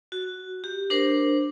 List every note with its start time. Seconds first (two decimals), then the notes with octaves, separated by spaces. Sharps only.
0.12 F#4
0.64 G4
0.90 D4 A#4 C5